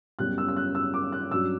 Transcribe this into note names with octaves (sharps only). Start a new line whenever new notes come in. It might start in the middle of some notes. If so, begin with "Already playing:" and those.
F#2 C#3 G3 B3 F#6
E6
E6
F#6
E6
D6
F#6
G2 F#3 C#4 E6